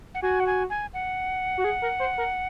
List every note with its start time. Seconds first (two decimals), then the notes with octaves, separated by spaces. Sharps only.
0.15 F#5
0.22 F#4 G#5
0.40 F#5
0.47 G#5
0.70 G#5
0.94 F#5
1.57 F#4
1.64 G#4
1.82 A#4
2.00 C5
2.18 A#4